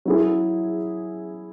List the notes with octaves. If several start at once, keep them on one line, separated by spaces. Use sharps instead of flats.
F#3 E4 G#4